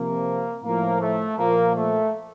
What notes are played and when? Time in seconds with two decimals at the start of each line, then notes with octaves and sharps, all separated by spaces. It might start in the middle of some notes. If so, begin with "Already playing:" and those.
Already playing: C3 F3 A#3
0.62 A2 F3 A#3
1.00 A3
1.38 A#2 F3 A#3
1.75 A3